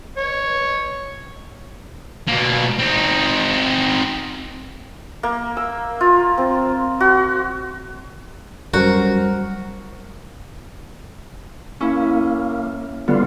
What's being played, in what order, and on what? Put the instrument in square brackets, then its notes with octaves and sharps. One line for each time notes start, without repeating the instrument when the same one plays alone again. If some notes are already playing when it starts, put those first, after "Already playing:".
[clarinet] C#5
[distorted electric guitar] B2 A#3
C4 D#4
[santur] A#3
E6
F4
C4
F#4
[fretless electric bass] F#2 [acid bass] G3 [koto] F#4 [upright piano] A#4 C5
[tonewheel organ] A#3 [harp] C#4 E4
[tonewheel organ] D3 G3 F4 [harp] B3